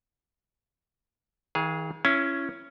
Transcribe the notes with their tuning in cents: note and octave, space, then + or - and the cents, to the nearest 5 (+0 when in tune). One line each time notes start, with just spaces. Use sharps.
D#3 +45 G#4 +0 F5 +0
C#4 +0 E4 +30